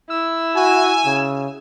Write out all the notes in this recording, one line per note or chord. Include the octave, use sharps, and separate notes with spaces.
E4 E6
F#4 G#5
C#3